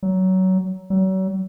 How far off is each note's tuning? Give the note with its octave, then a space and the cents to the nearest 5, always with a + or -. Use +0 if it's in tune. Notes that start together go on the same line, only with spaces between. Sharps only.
F#3 +20
F#3 +40